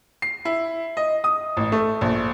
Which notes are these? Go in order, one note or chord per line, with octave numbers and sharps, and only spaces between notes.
C7
E4
D#5
D#6
A1
A3
A#1